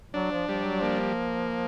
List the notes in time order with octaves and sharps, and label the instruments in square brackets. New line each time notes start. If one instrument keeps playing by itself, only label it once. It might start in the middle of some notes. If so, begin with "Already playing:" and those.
[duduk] F#3 [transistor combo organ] D4
[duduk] F3
[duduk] F3 [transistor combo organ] G3
[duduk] F#3
[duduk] F3 [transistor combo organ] A#3